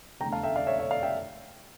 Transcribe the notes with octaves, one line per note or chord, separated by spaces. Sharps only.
F1 E2 D3 A3 G5 A#5
F5 A5
E5 G5
D5 F5
C#5 E5
C#5 E5
D5 F5
E5 G5